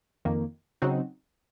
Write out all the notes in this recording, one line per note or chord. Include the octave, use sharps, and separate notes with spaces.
F2 D#3 A#3
C#3 F#3 C4 D#4 F#4